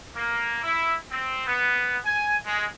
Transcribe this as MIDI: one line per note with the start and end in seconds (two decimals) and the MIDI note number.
0.16 0.60 58
0.63 0.95 64
1.10 1.43 60
1.47 1.96 59
2.05 2.35 80
2.45 2.64 56